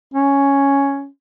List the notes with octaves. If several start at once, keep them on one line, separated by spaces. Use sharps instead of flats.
C#4